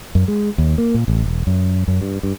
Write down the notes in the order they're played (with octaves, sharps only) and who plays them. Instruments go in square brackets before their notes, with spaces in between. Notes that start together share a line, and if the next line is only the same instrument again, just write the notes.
[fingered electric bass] F#2
G#3
D#2
A#3
A#2
A1
E1
F#2
F#2
G2
G2